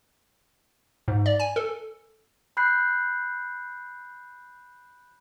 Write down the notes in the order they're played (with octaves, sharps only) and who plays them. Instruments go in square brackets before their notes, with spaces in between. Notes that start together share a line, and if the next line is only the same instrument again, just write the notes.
[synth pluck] G#2
D5
G#5
A4
[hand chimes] B5 F#6 G6 C7